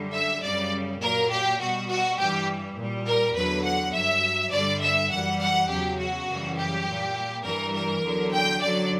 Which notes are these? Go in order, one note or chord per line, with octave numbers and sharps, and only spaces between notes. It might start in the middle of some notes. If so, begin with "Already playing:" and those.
Already playing: F#2 D3 G3
E5
F#2 C#3 G3 D5
A#2 F#3 A#4
G4
B2 G3 F#4
F#4
G2 E3 G3 G4
A#2
G3
A#4
E2 D3 F#3 B4
F#5
G2 F#3 E5
G2 D3 G3 D5
E5
F#2 E3 G3 F#5
F#5
E2 C#3 F#3 G4
F#4
F#2 C#3 E3 G3
G4
A#2 G3
G2 E3 G3 A#4
A#4
E2 D3 F#3
G5
F#2 D3 F#3 D5